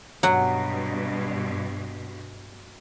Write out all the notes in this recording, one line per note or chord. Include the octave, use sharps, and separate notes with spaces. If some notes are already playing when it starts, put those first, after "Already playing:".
G2 B2 F#3 F#5